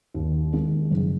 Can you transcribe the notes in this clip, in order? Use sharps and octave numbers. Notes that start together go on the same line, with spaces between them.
D#2
D#3 G#3
F#1